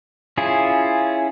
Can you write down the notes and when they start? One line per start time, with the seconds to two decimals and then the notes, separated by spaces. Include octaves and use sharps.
0.38 C#4 E4 F4 G#4